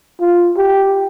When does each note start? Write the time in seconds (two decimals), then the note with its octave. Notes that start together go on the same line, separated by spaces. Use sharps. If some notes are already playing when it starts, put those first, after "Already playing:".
0.20 F4
0.57 G4